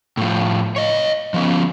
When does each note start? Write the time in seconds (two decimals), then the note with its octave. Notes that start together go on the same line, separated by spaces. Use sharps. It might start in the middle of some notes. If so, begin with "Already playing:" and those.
0.17 A2 F3
0.76 C#5 D#5
1.34 F3 B3 C#4